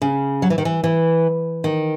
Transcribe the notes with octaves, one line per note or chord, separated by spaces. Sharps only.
C#3
F#3
E3
D#3
E3
E3
D#3